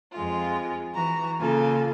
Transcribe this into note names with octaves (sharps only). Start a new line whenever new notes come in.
F2 G#3 F4
E3 F#4 A#5
C#3 A#3 F4 A4 G#5